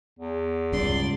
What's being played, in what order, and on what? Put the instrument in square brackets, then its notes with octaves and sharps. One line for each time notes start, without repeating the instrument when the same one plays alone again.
[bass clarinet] E2
[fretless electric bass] C#2 G2 C#3 [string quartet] D5 C6